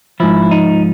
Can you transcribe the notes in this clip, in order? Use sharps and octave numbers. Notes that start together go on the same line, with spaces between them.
G#2 F3 E4
D#4